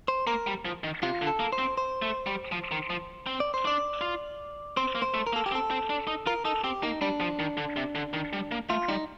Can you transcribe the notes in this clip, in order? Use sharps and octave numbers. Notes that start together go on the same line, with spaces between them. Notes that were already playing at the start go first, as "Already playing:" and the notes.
C5
A#3 A#4
G3
F3
D#3
C3 F4
D3
A4
A#3
C5
C4
C5
A3
G3
F3
D#3
F3
C4
D5
C5
D4 D5
F4
C4 C5
A#3
C5
A3
A#4
A#3
A4
G4
C4
A4
C4
D4
D#4
F4 A#4
D#4 A4
C4 G4
A#3 D#4
G3 D4
F3
D#3
D3
C3
D3
D#3
G3
A#3
A3 F4
G3 D#4